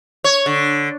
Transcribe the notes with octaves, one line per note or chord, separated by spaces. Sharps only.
C#5
D3